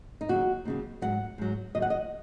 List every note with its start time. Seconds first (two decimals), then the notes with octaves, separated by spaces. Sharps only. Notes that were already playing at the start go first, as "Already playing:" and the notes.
0.21 D#4
0.29 D#2 C#3 F#3 F#4
0.65 D#2 C#3 F#3
1.02 G#2 F#3 F#5
1.38 G#2 F#3
1.75 D#2 D#3 F#3 D#5
1.82 F#5
1.90 D#5